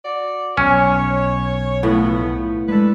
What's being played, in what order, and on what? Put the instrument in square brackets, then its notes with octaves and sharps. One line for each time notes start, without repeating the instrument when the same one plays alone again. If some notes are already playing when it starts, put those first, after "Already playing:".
[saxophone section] F#4 D5
[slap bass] B1 [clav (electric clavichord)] C#4 [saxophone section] C#5
[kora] A2 [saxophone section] F3 B3
[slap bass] G#3 [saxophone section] D4 A4 B4